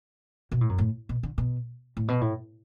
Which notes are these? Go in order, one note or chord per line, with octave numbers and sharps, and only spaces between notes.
B2
A2
F#2
A2
B2
D3
B2
A2
B2
A2